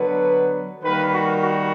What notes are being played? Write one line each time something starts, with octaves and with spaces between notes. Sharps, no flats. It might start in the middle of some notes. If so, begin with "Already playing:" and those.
Already playing: D3 F#3 B3 B4
D#3 G3 A#3 B4
F#4
F#4